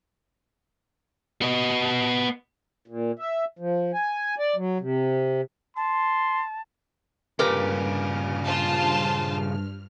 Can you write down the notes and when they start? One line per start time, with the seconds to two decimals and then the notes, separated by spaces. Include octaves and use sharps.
1.42 B3 D#5
2.88 A#2
3.19 E5
3.59 F3
3.94 G#5
4.39 D5
4.56 F#3
4.81 C3
5.77 A5 C6
7.39 G2 A#2 C#3 G4 A#4 B4 F6
8.44 F4 C5 A5